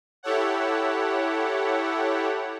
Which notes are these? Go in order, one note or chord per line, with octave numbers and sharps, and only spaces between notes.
E4 G4 A4 C#5 F#5